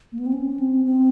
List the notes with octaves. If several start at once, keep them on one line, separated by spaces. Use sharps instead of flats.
A#3
B3
C4
C#4
C4
C4